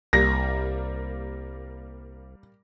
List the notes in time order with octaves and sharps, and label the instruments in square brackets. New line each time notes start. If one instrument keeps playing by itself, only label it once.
[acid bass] C2 [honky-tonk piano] G3 A#3 [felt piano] A#6